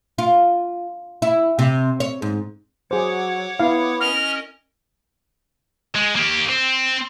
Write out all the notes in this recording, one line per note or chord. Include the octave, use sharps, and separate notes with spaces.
F4
E4
C3
C#5
G#2
F#3 G#4 C5 C#5 F#5 D6
B3 E4 F5
C#4 A#4 D#5 F6
G#3
A#3 G4
C4